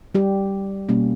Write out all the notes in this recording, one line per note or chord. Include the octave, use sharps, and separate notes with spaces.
G3 G4
B2 G3 A#3 C#4